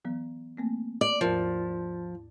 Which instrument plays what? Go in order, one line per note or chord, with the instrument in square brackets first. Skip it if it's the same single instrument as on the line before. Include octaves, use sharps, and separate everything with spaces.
[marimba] E3 F#3 B3
A3 A#3 C4
[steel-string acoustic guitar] D5
[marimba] D#2 G#2 A#4 [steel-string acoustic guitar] F3